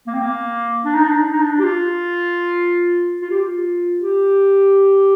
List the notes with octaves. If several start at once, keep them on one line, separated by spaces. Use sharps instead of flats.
A#3
C4
A#3
D4
D#4
D4
D#4
D4
D#4
D4
G4
F4
F4
G4
F4
G4